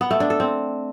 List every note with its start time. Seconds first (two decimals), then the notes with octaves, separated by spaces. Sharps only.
0.01 B3
0.11 A3
0.20 D4
0.30 A4
0.40 C4